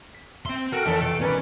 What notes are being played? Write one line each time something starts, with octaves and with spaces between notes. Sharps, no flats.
B6
C4 E5 C6
F#4 A4 A#4 G5
F2 E3 A#3 C#4 A4 E5 A5
C2 B2 G3 A4
G#1 C#4 B4 D5 A#5